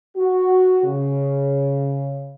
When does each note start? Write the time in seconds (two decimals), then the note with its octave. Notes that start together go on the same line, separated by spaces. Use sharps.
0.16 F#4
0.84 C#3